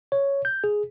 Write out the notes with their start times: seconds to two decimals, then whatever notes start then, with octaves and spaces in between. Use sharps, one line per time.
0.12 C#5
0.45 G6
0.64 G#4